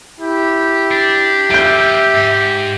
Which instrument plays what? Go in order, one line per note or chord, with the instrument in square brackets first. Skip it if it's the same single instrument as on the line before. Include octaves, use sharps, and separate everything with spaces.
[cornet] E4 [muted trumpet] G4
[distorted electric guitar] D4
[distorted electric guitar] G3 A#3 [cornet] E5 [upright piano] G6 D7
[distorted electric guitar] G#2